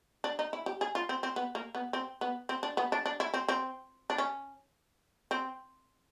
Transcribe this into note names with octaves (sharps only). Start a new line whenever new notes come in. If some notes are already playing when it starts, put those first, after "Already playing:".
D4
D#4
E4
G4
G#4
F4
C4
C4
B3
A#3
B3
C4
B3
C4
D4
B3
D4
D4
E4
C4
C4
D4
C#4
C4